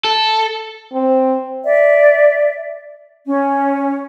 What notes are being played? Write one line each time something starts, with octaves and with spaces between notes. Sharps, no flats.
A4
C4
D5 E5
C#4